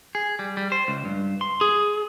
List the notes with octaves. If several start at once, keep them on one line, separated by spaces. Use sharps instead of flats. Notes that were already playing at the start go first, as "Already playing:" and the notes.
G#4
G3
G3
C5
C#2
G2
C6
G#4